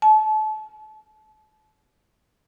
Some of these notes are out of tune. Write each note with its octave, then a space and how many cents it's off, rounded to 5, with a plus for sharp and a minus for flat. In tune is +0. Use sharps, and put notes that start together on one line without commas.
A5 -30